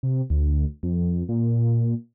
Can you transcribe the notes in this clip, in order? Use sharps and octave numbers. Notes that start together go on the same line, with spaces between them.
C3
D2
F2
A#2